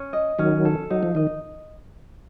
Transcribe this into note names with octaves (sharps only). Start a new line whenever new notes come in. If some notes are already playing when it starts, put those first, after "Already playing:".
Already playing: C#4
D#5
D#3 F#3 C#4
A4
F#3 D#4
F3
D#3 D#5